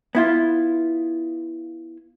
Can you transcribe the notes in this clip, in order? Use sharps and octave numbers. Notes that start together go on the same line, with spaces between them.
B3 E4 F4